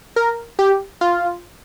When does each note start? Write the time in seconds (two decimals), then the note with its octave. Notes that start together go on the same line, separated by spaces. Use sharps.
0.16 A#4
0.59 G4
1.01 F4